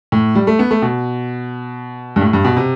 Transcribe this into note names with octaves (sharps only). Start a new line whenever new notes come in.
A2
G3
A3
B3
A3
B2
G2
A2
G2
B2
C3